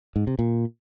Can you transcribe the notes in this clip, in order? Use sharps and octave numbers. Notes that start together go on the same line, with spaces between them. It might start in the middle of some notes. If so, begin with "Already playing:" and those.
G#2
C3
A#2